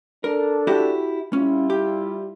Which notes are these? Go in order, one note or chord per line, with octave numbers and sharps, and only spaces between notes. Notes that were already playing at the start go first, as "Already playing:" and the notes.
D4 A4 A#4
E4 F#4 G4
G3 C#4 E4 F4
G4